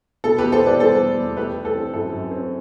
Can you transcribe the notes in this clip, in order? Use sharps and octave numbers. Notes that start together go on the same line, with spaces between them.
B2 A4
E2 G4 B4
A4 C5
E2 B4 D5
G3 A4 C5
E2
E2
A3 G4 B4
E3
A4
C4
F#2 A4
F#2
C4